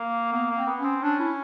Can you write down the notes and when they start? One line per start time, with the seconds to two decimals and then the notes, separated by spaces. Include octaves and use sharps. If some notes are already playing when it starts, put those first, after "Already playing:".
Already playing: A#3
0.32 A#3 B3
0.50 A#3
0.56 C4
0.67 B3
0.79 C#4
0.85 C4
1.03 C#4 D4
1.20 E4